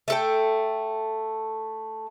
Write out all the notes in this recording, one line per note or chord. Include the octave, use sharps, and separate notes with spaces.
A3 A4 G5